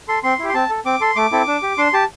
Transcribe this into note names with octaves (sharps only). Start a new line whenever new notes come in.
A4 C6
C4 C6
E4 G4
C6
C4 A5
A4
C4 D6
A4 C6
A3 D6
C4 E4 A4
D4
G4
D4 C6
G4 A5